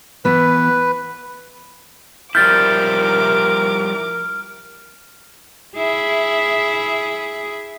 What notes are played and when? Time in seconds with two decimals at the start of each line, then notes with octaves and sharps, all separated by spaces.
0.25 E3 B3 B4
2.35 F3 G3 E4 A#4 D6 F6 G6 A6
5.76 E4 G#4